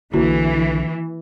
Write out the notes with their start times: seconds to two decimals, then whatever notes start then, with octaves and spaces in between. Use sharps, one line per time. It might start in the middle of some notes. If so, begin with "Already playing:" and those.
0.14 B1 D3 E3 A#3 E4 F#4